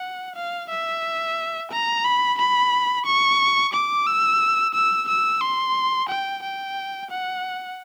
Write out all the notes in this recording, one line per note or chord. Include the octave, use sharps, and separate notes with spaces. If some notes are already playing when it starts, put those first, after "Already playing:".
Already playing: F#5
F5
E5
A#5
B5
B5
C#6
D6
E6
E6
E6
C6
G5
G5
F#5